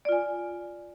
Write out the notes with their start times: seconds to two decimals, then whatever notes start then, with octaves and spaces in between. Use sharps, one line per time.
0.05 D5
0.09 F4
0.12 G#5